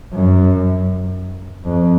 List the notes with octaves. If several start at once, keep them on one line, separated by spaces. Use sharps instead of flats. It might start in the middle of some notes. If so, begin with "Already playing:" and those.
F#2
F2